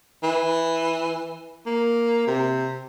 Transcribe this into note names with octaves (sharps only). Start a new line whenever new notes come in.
E3
A#3
C3